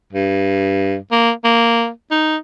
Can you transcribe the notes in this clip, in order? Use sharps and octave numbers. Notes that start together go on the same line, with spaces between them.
G2
A#3
A#3
D#4